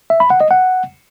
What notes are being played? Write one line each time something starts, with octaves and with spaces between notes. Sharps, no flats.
E5
B5
F#5
D#5
F#5